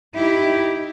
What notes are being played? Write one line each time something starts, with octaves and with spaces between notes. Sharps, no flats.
D#4 E4 G4